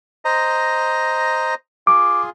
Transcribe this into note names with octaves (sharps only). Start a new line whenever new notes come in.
C5 D#5 A#5
F4 G#4 D6